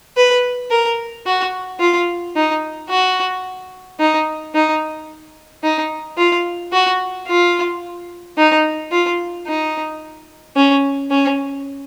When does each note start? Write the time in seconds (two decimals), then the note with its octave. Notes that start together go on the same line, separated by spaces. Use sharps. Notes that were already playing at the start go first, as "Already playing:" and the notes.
0.17 B4
0.71 A#4
1.26 F#4
1.80 F4
2.36 D#4
2.90 F#4
4.00 D#4
4.55 D#4
5.64 D#4
6.18 F4
6.72 F#4
7.28 F4
8.38 D#4
8.91 F4
9.46 D#4
10.56 C#4
11.10 C#4